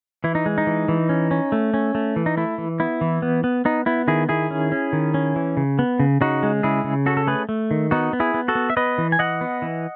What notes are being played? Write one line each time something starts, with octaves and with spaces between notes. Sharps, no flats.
E3 E4
D#4
G#3
D#4
E3
E3
C#4
C#4
A3
C#4
A3
E3
D#4
A3 E4
E3
B3 E4
E3
B3
B3
B3 D#4
B3 E4
D#3 E4 G#4
D#3 E4 G#4
C#4
C#4
D#3
C#4
E3
C#3
B3
C#3
C#3 D#4 F#4
G#3
C#3 E4 G#4
C#3
C#4 F#4 A4
A4
A3 G#4 B4
A3
D#3
B3 D#4 F#4
B3
E4 G#4
B3
F#4 A4
B3
E5
B3 B4 D#5
E3
G#5
E3 D#5 F#5
B3
E3